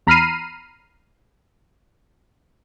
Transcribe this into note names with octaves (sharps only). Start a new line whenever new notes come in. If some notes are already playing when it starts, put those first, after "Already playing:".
E2 A#5 B5 F6 C7 D#7